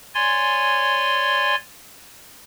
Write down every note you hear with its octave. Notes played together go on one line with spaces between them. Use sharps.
C#5 D5 G#5 C6